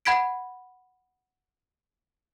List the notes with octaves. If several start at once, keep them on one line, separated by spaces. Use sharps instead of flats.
F#5 B5 G#6 B6 D7